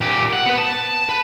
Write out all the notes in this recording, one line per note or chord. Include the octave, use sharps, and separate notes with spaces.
A#2 G4
F#5
B3 B4
A5
B4